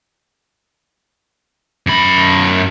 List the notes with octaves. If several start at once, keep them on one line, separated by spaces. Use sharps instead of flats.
F#2 B5